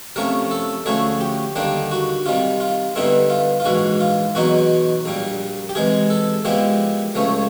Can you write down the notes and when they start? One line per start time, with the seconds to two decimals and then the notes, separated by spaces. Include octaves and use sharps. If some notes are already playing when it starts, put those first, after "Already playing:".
0.16 C3 F3 A3 C#4 A#4
0.51 A4
0.86 D2 D3 F3 A3 C#4 G#4
1.21 G4
1.56 D#2 D3 G3 A#3 D4 G4
1.91 F#4
2.26 C3 D#3 G3 F4
2.60 F4
2.95 G2 D3 G3 B3 D#4 E4
3.30 F4
3.60 F4
3.65 A#1 G#2 E3 F#4
4.01 F4
4.35 E2 B2 F#3 B3 D#4 F#4
5.06 A#1 A#2 G3
5.69 G4
5.75 C3 E3 G#3 G#4
6.10 A4
6.45 A#2 F3 G#3 B3 E4 G4
7.15 C#2 C#3 F3 A3 C#4